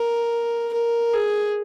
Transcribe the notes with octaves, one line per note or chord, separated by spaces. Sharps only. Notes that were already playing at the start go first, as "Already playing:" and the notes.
Already playing: A#4
A#4
G#4